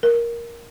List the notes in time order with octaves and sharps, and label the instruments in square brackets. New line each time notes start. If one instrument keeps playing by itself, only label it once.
[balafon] A#4